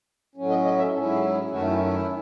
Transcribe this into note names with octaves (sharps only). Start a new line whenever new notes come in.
A2 F#3 C#4
D#5
D#5
E5
G#2 F#3 C#4 E4 A4
G#4
G#4
F#2 D#3 A3 C#4 E4 F#4
E4
E4